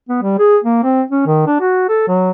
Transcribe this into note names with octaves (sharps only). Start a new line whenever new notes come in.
B3
G3
G#4
A#3
C4
C#4
D#3
D4
F#4
A4
F#3